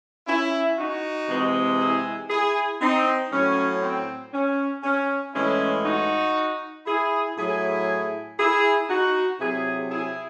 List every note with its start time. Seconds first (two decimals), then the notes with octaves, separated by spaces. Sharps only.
0.27 C#4 E4
0.78 D#4 F#4
1.29 C3 E3 G#3
1.79 E4 G#4
2.30 E4 G#4
2.80 C4 D#4
3.31 A2 F#3 C#4
3.82 C4
4.33 C#4
4.83 C#4
5.34 A2 E3 G#3 C#4 E4
5.84 D#4 F#4
6.86 E4 G#4
7.37 A2 F#3 E4 G#4
8.38 E4 G#4
8.89 D#4 F#4
9.39 C3 F#3 E4 G#4
9.90 E4 G#4